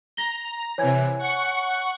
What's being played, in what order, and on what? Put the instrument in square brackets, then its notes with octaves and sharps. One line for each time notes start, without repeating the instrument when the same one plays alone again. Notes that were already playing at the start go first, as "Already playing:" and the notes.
[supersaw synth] A#5 [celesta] A#6 G7
[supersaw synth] C3 E3 [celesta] C#5 G#5 G#6
[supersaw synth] F#5 C#6 C#7